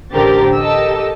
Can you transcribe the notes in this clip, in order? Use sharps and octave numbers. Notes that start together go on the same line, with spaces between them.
A1 D3 G4 A#4 C5 A6
G4 A4 A#4 D#5 A5 E6